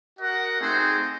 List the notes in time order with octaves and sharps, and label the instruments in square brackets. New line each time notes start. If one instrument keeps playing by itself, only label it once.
[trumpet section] F#4 A#4 D#5 F#5
A3 C4 D#4 G#4 C5